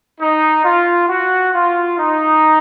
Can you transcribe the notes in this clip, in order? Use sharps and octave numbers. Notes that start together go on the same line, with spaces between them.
D#4
F4
F#4
F4
D#4